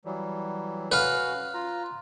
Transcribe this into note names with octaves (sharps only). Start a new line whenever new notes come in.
E3 F#3 G3
C#4 F#4 B4 F5
F4 A#5